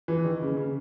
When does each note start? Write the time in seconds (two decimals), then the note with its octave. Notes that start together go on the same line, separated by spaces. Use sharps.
0.08 E3
0.25 D#3
0.42 C#3
0.57 C#3